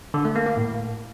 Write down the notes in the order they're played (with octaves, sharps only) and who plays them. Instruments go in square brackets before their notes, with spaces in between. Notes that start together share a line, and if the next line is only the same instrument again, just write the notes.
[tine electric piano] D3
A3
A#3
A#3
A2